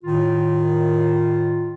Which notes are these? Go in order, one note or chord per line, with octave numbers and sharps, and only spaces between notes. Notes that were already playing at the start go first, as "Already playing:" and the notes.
A2 D#3 F4